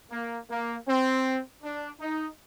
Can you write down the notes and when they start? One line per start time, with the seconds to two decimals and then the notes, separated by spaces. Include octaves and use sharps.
0.11 A#3
0.49 A#3
0.87 C4
1.63 D4
2.00 D#4